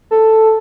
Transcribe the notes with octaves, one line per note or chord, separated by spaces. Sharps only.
A4